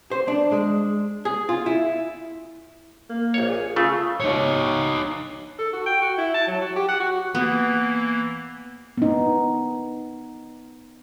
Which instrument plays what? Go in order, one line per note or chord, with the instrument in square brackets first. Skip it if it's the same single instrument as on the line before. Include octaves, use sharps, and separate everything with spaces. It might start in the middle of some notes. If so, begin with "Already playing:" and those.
[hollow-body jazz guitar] C5
D4
G#3
G#4
F4
E4
[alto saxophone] A#3
[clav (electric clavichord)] A#1 C#5
[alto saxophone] G#4
[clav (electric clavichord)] C#3 A3 [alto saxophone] F4
[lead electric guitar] D#4 C#5
[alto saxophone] A4
F#4
G5
F#4
E4
A5
F#3
F#4
G4
F#5
F#4
[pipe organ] E3 A#3 [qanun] B3
[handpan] B3 D#4